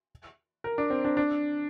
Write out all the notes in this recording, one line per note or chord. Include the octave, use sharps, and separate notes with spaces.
A#4
D4
C4
D4
D4